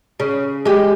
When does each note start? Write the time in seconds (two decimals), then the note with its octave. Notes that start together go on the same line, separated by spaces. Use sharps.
0.20 C#3
0.65 G#3 G4